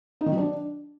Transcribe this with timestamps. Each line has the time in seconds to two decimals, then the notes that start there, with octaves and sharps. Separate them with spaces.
0.21 D#4
0.26 D#3
0.32 F#3
0.37 D4